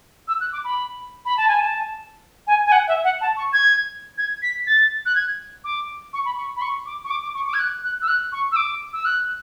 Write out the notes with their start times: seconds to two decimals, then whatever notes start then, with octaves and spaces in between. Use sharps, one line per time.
0.28 E6
0.40 F#6
0.53 D6
0.65 B5
1.25 B5
1.37 A5
1.48 G#5
1.60 A5
2.47 G#5
2.66 G#5
2.72 F#5
2.88 E5
3.04 F#5
3.21 A5
3.37 C#6
3.53 G#6
4.18 G#6
4.42 B6
4.67 A6
5.06 F#6
5.15 G#6
5.64 D6
6.13 C#6
6.25 B5
6.37 C#6
6.56 B5
6.62 C#6
6.86 D6
7.04 C#6
7.11 D6
7.22 D6
7.35 C#6
7.47 D6
7.54 G#6
7.59 F#6
7.84 F#6
8.02 E6
8.08 F#6
8.32 C#6
8.52 E6
8.56 D6
8.93 E6
9.05 F#6